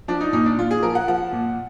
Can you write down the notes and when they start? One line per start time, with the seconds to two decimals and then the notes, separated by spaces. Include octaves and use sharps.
0.08 F3 D4
0.21 D#4
0.33 A#2 D#4
0.46 D4
0.59 A#2 F4
0.71 G#4
0.83 F3 A#4
0.95 F#5
1.08 F3 F#5
1.33 A#2